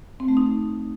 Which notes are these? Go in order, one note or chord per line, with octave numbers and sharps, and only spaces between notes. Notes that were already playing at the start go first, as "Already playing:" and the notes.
C4
A3
D#4